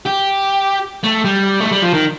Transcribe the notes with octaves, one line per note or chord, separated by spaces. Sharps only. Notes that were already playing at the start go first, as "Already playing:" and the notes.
G4
A3
G3
A3
G3
F3
D#3